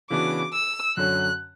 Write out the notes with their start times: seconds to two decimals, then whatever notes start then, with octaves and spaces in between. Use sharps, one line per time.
0.10 C#3 E3 B3 D4 F#4 D6
0.54 E6
0.97 F#2 D3 F#3 C#4 F#6